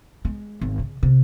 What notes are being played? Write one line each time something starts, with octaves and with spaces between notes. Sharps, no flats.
G#3
G#1
C#3
C3